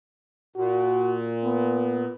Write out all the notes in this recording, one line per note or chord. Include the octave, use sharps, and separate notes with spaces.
A#2 F#4
B3